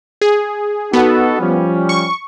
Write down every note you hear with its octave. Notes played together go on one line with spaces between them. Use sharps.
G#4
B3 D#4 F#4 A4
F3 G3 C#4
C#6